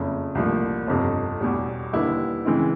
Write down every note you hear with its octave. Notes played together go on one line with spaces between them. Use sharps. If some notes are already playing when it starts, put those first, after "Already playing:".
Already playing: F#1 F2 C#3
C2 A#2 F3 A3 D4
G1 F2 C3
E2 B2 G3
D#2 D3 G3 B3 E4
C#3 E3 G#3 C4 E4